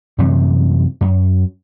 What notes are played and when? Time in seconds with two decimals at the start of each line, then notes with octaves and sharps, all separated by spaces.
0.18 F#2 C3 E3 G3
1.01 F#2